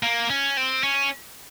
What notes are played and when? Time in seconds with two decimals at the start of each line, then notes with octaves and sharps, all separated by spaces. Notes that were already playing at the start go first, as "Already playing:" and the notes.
0.03 A#3
0.30 C#4
0.57 C4
0.83 C#4